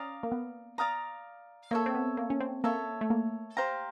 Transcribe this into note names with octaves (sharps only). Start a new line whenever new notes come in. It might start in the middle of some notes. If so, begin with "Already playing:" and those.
Already playing: C#4 D5 F5 A#5 D#6
A#3
B3
D5 F5 A#5 D#6
A#3 A4 C#5 E5
C4
B3
A#3
C#4
C4
A#3 A4 C#5 E5
A3
A#3
G4 C5 F5 A#5